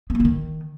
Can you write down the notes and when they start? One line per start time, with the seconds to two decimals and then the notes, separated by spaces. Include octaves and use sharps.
0.10 B3
0.15 A#3
0.20 E3
0.25 D#3